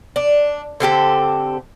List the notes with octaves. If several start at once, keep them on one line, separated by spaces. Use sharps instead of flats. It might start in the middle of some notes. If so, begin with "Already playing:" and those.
D4
D3 C4 G4 A4